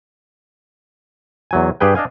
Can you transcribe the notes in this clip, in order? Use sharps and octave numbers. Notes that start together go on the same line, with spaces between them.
E2 F#3 G#5
G2 G4 G#4 B4 G5
D4 D#5 F5 G#5